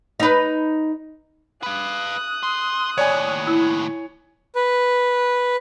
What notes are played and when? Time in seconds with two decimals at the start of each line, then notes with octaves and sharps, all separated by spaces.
0.20 D#4 B4
1.63 B4 F5 D#6 F#6
2.43 C6
2.98 D#2 A2 C#5 D5 G#5
3.47 E4
4.55 B4